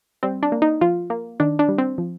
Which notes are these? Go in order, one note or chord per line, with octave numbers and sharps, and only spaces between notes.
G3 C4
D4
A#3
D#4
F3 F4
A#3
D#3 D4
D4
G3
C4
F3